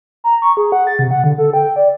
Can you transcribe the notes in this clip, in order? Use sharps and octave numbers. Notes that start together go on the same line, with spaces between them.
A#5
C#6
G#4
F#5
A6
C3
F#5
D3
A4
G5
D5